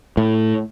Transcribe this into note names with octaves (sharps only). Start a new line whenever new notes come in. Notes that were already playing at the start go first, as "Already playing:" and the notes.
A2